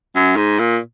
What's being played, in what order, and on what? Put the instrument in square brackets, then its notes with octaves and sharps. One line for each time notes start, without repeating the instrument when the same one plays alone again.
[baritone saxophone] F#2
G#2
A#2